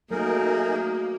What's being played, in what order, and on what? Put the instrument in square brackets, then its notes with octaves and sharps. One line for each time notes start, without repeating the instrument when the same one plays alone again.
[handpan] F#3 [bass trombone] A3 [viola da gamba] A#3 [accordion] D#4 G#4 A#4